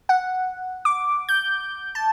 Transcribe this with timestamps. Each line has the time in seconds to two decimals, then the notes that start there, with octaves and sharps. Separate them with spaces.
0.09 F#5
0.85 D6
1.29 G6
1.95 A5